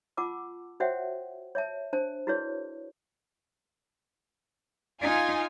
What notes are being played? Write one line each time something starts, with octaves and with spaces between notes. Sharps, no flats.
F4 F#5 A5 D6 E6
F#4 C5 C#5 E5 F#5 G5
C#5 E5 A5
D4 C5 A5
E4 F#4 G#4 B4 C#5 D5
D#4 F4 G#5